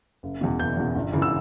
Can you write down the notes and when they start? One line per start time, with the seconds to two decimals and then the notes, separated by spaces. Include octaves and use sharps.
0.23 F#1
0.41 E2 B2
0.59 F#1 G6
0.77 E2 B2
0.95 G1
1.12 F#2 C#3 E3
1.22 E6